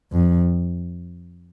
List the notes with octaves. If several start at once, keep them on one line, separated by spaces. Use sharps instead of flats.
F2